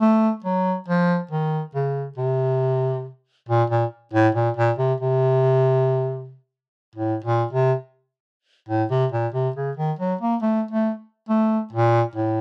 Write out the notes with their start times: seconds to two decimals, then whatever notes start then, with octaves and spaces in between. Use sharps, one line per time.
0.01 A3
0.44 F#3
0.88 F3
1.31 D#3
1.75 C#3
2.17 C3
3.49 A#2
3.70 A#2
4.13 A2
4.35 A#2
4.57 A#2
4.78 C3
5.00 C3
6.96 A2
7.24 A#2
7.53 C3
8.69 A2
8.91 C3
9.12 A#2
9.34 C3
9.56 C#3
9.77 D#3
9.99 F#3
10.21 A#3
10.42 A3
10.71 A3
11.29 A3
11.73 A#2
12.16 A2